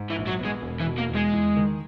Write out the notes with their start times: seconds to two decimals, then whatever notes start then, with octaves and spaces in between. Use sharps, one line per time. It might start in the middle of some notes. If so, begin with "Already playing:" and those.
Already playing: G#2
0.10 E3
0.16 A#1
0.27 F#3
0.39 B3
0.45 G#3
0.62 E1
0.80 E3
0.86 B2
0.98 A#3
1.09 E2
1.15 G#3
1.33 E2
1.56 D#3